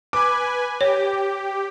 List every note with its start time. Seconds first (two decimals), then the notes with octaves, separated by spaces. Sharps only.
0.13 B4 G#5 D6
0.81 G4 C#5